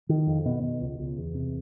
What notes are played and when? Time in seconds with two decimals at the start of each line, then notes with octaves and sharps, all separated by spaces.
0.09 D#3
0.27 F2
0.46 B2
0.63 B2
0.81 C#2
0.99 C#2
1.18 E2
1.35 C3